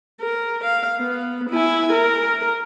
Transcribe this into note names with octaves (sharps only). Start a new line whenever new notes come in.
A#4
F5
B3
E4 G#5
A#4